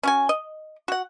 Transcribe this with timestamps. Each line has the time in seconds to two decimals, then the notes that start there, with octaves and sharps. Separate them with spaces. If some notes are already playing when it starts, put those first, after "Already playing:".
0.03 C#4 F#4 G#5
0.29 D#5
0.88 F#4 F#5